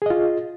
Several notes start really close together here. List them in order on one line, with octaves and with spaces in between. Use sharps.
G#4 D#5 F4